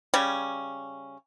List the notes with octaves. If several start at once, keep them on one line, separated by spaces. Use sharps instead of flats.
C#3 G3 C#4